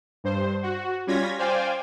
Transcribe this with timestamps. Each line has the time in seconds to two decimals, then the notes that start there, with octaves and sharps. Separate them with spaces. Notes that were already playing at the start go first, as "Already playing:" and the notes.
0.24 G2 C5
0.63 F#4
1.07 G3 C#4 F4 G#6 A#6 B6
1.39 C5 D5 F5 G5 G#5